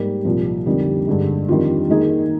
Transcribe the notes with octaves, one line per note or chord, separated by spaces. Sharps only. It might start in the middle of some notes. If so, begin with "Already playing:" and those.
Already playing: G#2 G3 A#3 D#4
C2 A#2 F3
F2 D3 G3 A#3 D#4
G2 D3 G#3
F2 D#3 G3 D4 F4
D#3 A#3 D#4 G#4